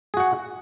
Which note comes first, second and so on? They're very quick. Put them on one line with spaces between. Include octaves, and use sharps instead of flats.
G#4 F#4 F#5